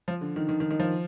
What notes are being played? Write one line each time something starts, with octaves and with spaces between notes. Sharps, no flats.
F3
D3
D#3
D#3
D#3
D#3
F3